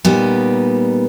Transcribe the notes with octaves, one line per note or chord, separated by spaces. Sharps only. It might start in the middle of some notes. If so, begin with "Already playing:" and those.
A#2 G3 B3 D#4